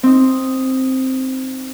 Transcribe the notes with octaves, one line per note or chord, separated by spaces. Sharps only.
C4 D#4